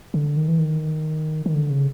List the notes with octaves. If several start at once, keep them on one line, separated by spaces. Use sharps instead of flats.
D3
D#3
E3
D#3
D#3
D3
C#3